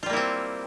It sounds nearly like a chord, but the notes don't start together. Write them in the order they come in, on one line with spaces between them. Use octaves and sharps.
F4 G3 A#3 E4 C4